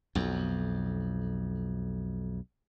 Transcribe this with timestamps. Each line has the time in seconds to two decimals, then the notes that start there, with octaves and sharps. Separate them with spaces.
0.15 B1 F2